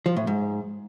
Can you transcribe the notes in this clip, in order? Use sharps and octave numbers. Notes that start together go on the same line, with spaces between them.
F3
A2
G#2